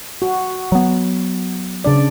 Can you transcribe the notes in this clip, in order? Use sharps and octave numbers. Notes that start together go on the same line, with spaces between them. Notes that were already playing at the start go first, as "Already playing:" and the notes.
F#4
F#3 B3
C#3 D4 D5